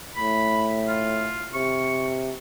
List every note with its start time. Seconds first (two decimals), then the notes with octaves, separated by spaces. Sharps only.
0.16 A2 B5
0.88 F4
1.54 C3 C#6